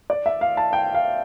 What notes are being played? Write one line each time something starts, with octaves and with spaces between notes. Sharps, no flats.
D5
E5
F5
A5
G5
F5